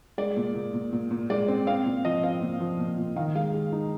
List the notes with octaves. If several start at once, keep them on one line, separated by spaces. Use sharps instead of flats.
G#3 D5
A#2
A#2
A#2
A#2
A#2
G#3 D5
C4
C4 F5
A#2
F3 D#5
C4 F5
A#2
F3
A#2
A#2
D#3 F5
G#3 F5
G#3
D#4